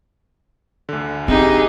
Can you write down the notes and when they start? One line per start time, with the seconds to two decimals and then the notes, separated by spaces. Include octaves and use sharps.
0.89 D2 D3
1.28 C4 D#4 G4 G#4